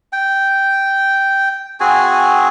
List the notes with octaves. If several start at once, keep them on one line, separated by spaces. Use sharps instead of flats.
G5
C4 F#4 G#4 G#5